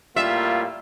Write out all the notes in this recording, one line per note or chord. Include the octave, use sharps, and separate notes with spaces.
A2 G3 A#3 F4 E5